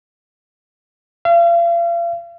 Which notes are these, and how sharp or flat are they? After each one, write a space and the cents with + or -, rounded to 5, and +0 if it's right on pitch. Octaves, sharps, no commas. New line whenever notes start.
F5 -40